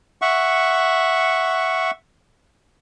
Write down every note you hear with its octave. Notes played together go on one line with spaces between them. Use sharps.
E5 F#5 C#6